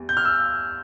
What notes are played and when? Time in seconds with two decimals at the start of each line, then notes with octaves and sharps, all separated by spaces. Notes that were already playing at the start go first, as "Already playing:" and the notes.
Already playing: E2 G3
0.09 G6
0.17 F6
0.25 E6